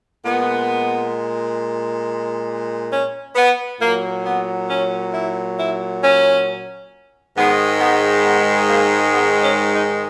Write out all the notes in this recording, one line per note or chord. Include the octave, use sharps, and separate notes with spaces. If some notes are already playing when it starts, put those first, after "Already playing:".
A#2 G#3 B3
C#4
B3
A#2 F#3 A#3
B3
C#4
E4
E4
C#4
G#2 D#3 G#3 B3
B3
B3
A#3
B3
C#4
D#4